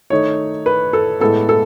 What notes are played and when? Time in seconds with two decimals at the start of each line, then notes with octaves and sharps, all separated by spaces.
0.10 D#3 A3 D#4 C#5
0.66 B4
0.93 A4
1.20 A2 G#3 B3 A4
1.49 A4